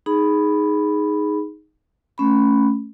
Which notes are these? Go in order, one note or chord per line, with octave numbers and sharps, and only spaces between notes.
D#4 G#4 B5
A3 C#4 B5